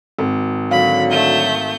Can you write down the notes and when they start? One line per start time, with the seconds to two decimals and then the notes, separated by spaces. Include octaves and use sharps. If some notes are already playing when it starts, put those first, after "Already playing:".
0.19 G#1
0.71 D3 F#3 F5 B5
1.11 A3 G6